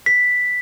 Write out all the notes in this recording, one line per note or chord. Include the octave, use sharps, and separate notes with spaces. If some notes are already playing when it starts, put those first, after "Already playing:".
B6